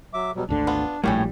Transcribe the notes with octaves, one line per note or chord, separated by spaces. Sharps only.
F#3 E5 D6
B2 F#3 G3
G#1 D2 D3 D4
B3 F4
A#1 A2 G3 C#4 G4 A#4